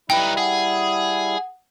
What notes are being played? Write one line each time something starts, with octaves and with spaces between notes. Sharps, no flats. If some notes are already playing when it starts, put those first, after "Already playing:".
G3 D#4 E4 B4 G5
G#4 F#5